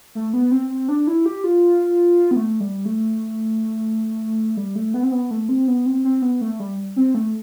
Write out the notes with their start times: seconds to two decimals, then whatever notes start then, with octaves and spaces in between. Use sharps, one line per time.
0.15 A3
0.33 B3
0.52 C4
0.70 C4
0.89 D4
1.07 E4
1.26 G4
1.44 F4
2.31 B3
2.36 A3
2.60 G3
2.85 A3
4.57 G3
4.75 A3
4.94 B3
5.03 C4
5.12 B3
5.31 A3
5.49 C4
5.68 B3
5.86 C4
6.05 C4
6.22 B3
6.41 A3
6.60 G3
6.96 C4
7.15 A3